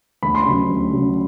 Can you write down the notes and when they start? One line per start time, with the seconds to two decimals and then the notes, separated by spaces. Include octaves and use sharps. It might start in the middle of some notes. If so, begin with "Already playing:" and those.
0.23 D2 B5
0.35 C6
0.45 C#3 F#3 B5
0.70 D2
0.92 C#3 F#3